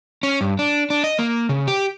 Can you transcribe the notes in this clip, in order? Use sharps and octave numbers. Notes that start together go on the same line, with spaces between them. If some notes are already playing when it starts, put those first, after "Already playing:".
C#4
G2
D4
D4
D#5
A#3
C#3
G4